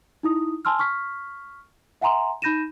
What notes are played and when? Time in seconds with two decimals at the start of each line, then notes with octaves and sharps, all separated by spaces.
0.23 D#4 E4 D#6
0.65 G#5 A5 C6 E6 F6
0.79 C#6 F6 B6
2.01 E5 F#5 G#5 A#5 C6
2.42 D#4 B5 G6 A#6 D#7 E7